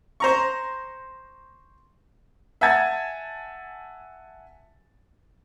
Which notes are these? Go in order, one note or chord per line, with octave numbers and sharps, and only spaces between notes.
C5 A#5 C#6
E5 F#5 G#5 A5 G#6 A6